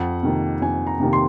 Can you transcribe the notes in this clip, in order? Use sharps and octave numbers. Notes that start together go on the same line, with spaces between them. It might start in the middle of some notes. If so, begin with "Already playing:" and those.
Already playing: F2 F#5
C3 D#3 A#3
F2 G#5
A#5
C3 D#3 A#3
C6